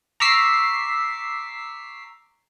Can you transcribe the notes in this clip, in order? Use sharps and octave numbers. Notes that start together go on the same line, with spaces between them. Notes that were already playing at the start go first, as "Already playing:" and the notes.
A#5 C#6 D6 E6 B6 C7